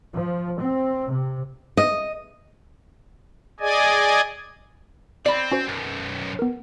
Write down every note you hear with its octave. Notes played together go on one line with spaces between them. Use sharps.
F3
C4
C3
D#5
G#4 D5 D#5 G#5
C4 D5 B5
C#4 F#4 C5
B1 F#2
B3 A#4